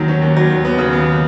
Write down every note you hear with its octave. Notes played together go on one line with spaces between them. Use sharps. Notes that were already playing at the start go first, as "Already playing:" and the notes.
Already playing: D#2 D#3 F#3
C#4
D#2
F#3
D#2
B3
C#3
D#2